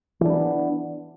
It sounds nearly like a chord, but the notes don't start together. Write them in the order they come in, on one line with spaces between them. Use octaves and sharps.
E3 D4 B3